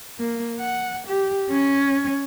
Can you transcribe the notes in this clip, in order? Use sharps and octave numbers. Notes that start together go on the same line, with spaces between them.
A#3
F#5
G4
C#4